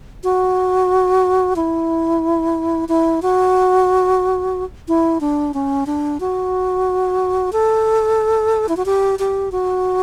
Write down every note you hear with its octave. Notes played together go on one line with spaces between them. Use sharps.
F#4
E4
E4
F#4
E4
D4
C#4
D4
F#4
A4
E4
F#4
G4
G4
F#4